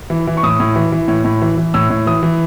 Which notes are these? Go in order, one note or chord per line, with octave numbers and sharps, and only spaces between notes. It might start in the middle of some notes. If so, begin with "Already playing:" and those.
E3
E3
C#6
A2 D#6
A2
E3
E3
A2
A2
E3
E3
A2 E6
A2
E3 D#6
E3